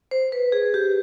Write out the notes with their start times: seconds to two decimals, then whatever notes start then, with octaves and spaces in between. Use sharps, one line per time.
0.11 C5
0.32 B4
0.52 G#4
0.74 G4